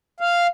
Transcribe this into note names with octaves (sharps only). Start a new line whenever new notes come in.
F5